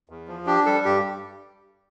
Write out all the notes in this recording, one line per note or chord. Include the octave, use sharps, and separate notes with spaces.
E2
F3
D4 G4
G3 A4
G2 G4